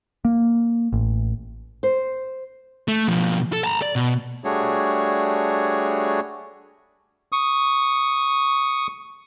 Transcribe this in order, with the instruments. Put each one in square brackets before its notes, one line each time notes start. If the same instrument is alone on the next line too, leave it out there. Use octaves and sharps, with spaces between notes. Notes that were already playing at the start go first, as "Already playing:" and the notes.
[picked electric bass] A#3
A1
[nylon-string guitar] C5
[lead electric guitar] A3
B2 F3
A4
A5 A#5
D5
B2
[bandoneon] G3 A3 D4 F#4 G#4 C#5
[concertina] C#6 D#6